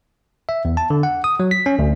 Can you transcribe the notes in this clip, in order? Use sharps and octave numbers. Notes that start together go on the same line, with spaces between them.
E5
E2
A5
D3
F#5
D#6
F#3
B6
C#4
D2